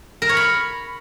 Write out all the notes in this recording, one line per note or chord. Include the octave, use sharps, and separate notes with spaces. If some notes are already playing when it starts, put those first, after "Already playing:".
A#4
C#5
B5